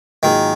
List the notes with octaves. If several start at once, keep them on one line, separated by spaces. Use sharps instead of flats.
G#2 D#3 F#3 A#3 F4 G#4